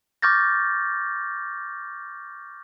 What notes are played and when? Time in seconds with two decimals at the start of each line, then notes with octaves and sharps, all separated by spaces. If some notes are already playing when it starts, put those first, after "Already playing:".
0.22 C#6 D6 F6 G6 A6 A#6